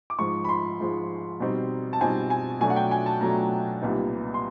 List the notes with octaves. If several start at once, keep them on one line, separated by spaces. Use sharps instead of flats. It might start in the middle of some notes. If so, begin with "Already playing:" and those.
D6
G#2 F3 G#3 C#6
B5
C6
G#2 F3 G#3
B2 G3 C4 D#4
A5
B2 G3 C4 D#4 G#5
G#5
B2 F#3 A3 D4 G#5
F#5
G5
G#5
A5
B2 F#3 A3 D4 A#5
C2 A#2 G3 B3 D#4
C6